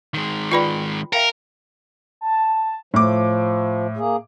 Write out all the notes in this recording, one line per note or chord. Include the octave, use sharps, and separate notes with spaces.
D#3 G#3
F4 B4 D5 G5 B5
A#4 E5 F5 G5
A5
A2 F3 D6
A#3 G#4